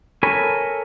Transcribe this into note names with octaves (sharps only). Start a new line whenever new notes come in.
A4 A#4 C#5 G#5 B5